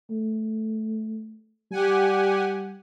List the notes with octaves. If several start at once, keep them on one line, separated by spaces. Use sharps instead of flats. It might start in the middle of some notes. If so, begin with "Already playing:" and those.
A3
G3 G4 F#5 G#5